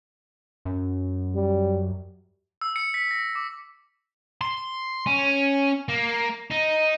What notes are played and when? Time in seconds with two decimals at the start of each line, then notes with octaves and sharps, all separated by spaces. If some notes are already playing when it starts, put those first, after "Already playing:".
0.65 F#2
1.35 G3
2.61 E6
2.76 C#7
2.94 B6
3.11 A#6
3.35 D6
4.41 C6
5.06 C#4
5.89 A#3
6.50 D#4